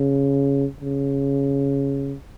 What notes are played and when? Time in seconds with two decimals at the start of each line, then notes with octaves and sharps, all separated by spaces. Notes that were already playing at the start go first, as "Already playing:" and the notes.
Already playing: C#3
0.81 C#3